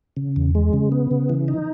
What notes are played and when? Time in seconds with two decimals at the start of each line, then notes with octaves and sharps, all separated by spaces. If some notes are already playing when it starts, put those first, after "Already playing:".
0.17 C#3
0.36 E2
0.55 G#3
0.73 C#3
0.92 B3
1.11 C#3
1.29 E3
1.48 D#4